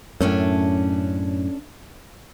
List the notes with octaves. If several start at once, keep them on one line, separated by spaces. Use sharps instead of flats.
F#2 A2 A3 C#4 D4